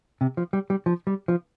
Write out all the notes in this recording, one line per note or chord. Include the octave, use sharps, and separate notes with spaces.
C3
F3
G3
G3
F3
G3
F3